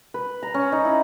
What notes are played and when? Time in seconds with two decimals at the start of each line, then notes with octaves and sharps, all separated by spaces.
0.14 B4
0.43 A#5
0.54 C#4
0.72 D#4
0.85 E4